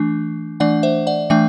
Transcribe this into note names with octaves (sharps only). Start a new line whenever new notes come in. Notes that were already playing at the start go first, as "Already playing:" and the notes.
Already playing: E3 A3 D4
E3 A3 D4 D5 F#5
C5 E5
D5 F#5
E3 A3 D4 E5 G5